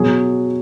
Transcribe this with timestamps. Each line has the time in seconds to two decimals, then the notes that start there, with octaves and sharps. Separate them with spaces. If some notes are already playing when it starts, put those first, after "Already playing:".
Already playing: B2 F#3 G#4